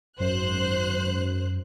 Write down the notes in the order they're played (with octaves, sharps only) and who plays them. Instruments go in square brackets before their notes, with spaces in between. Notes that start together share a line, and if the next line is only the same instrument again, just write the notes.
[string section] G#1 C5 F#6 [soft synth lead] F#2